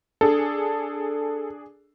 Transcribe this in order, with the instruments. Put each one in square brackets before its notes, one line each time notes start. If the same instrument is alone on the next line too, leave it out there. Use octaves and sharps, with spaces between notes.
[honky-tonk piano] D4 G#4 [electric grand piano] A4